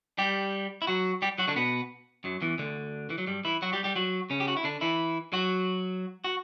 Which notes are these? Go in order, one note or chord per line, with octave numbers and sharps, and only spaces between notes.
G3 G4
E4
F#3 F#4
G3 G4
F#3 F#4
D3 D4
B2 B3
F#2 F#3
E2 E3
D2 D3
E3
F#3
G2 G3
E3 E4
F#3 F#4
G3 G4
G3 G4
F#3 F#4
C#3 C#4
G4
F#4
E4
D3 D4
E3 E4
F#3 F#4
F#4